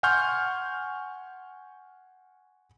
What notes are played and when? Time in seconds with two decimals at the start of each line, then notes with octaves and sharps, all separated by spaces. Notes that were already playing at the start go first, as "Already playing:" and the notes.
0.03 F#5 G#5 C6 C#6 F6 G6